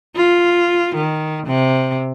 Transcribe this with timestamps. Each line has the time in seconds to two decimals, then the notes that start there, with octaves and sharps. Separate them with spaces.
0.16 F4
0.95 D#3
1.47 C3